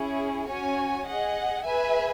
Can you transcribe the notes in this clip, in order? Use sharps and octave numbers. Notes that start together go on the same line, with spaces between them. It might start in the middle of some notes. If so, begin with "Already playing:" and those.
Already playing: C#4 E4 G#4
C#4 F#4 C#5 G#5
G#4 D#5 F#5
G#4 B4 E5 G#5